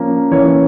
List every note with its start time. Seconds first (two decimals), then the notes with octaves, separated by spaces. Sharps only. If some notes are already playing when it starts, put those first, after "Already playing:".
Already playing: F3 A#3 C#4
0.31 E3 A#3 C#4 C#5